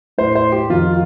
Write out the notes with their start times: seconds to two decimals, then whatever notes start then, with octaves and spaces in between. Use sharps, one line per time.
0.18 A2 C5
0.36 C5
0.52 G4
0.69 F2 D#3 F4